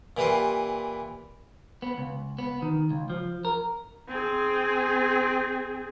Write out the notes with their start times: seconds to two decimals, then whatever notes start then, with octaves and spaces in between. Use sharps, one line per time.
0.17 A#2 E3 G4 B4 C6
1.82 B3
1.98 C#2
2.39 B3
2.62 D#3
2.91 C#2
3.10 F3
3.45 A#4
4.08 C4 G#4